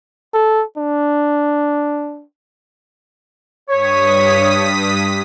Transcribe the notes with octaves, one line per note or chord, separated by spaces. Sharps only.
A4
D4
G2 C#5 D#6 B6